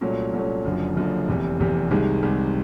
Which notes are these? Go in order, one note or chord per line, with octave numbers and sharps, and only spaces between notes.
C2 A#2 F#3 A3 C#4
C2 A#2 F#3 A3 C#4
F#1 F#2 D3 F3
F#1 F#2 D3 F3
F1 E2 C3
F1 E2 C3
C2 C3 D#3 G#3
C2 C3 D#3 G#3